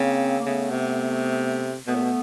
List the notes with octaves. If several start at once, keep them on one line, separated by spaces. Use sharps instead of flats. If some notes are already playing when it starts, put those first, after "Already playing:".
Already playing: C#3 A#3 C4
A#3
C#3 A3 B3
C3
B2 A3 B3
A#2
B2